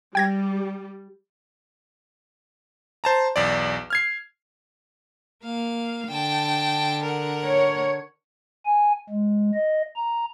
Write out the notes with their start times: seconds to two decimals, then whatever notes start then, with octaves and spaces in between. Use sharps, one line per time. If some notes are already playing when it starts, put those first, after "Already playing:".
0.15 G3 G5 G#6 A#6
3.04 C5 A5 A#5
3.36 B1 E2 D5
3.90 F6 G#6 C7
5.44 A#3 F5
6.10 D3 G5 A5
7.03 A#4 F#5
7.47 C#5
8.65 G#5
9.10 G#3
9.54 D#5
9.96 A#5